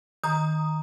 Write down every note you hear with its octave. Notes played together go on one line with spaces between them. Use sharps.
D#3 A#5 D#6